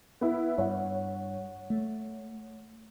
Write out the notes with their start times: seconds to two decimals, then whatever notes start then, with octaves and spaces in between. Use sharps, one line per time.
0.21 B3 E4
0.58 G2 C#5 F#5
1.70 A3